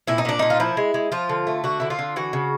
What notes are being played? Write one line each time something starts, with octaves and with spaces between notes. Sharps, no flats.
A#2 E4
D#4
A#2 D4
A#2 D#4
F4
F3 E4
G#3
G#3
F3 F4
D3
A3
D3 F#4
D3 E4
F4
D3
E3 F#4
C#3